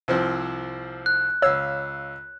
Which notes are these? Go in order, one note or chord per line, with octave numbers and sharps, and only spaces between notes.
C2 F3 C4
F#6
C#2 C#5 F5 E6